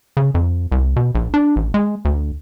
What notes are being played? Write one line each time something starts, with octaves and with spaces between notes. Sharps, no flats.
C#3
F2
C2
B2
A#1
D4
A1
G#3
D2